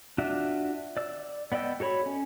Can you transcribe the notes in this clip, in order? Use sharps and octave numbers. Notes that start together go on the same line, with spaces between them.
D4 F4 F#4 E5
D5 E6
B3 D5 D#5 G5 E6
F#4 A4 C#5 B5
C#4